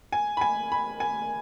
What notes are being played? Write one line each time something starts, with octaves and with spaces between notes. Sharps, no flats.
G#5
B5
G#5
B5
G#5